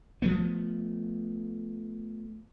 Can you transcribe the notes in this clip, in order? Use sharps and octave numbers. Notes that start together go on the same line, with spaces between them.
F3 A3 B3